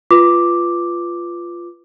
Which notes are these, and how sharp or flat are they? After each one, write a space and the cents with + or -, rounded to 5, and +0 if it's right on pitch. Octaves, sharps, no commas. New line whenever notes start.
F4 -10 B4 +0 D6 +0